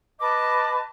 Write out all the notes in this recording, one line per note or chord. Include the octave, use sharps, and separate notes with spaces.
B4 D#5 A5 D6